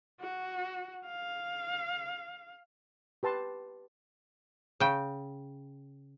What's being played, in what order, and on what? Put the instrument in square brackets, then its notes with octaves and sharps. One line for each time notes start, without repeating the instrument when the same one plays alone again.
[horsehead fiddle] F#4
F5
[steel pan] G4 B4 A5 C6
[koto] C#3 G5